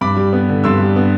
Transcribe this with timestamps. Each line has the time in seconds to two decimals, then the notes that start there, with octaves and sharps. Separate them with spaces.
0.01 G2 B5 D6
0.16 G3
0.33 B3
0.49 D3
0.64 G2 C6 E6
0.80 G3
0.96 B3